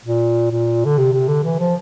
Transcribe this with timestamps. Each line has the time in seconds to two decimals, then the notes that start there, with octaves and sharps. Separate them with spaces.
0.05 A#2
0.52 A#2
0.86 D3
0.98 C3
1.13 C3
1.28 D3
1.44 E3
1.59 F3